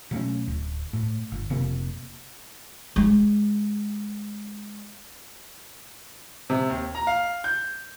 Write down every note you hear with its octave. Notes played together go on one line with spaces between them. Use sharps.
B2 F#3 A3 C#4
D1
A2
G1
F1 C3 A#3
G#3 D4
C3
D#2
A#5
F5
G6